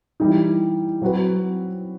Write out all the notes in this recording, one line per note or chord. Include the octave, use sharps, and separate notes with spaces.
E3 G3 D#4
F#3 C4 F#4 B4